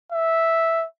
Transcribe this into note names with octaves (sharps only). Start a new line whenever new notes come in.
E5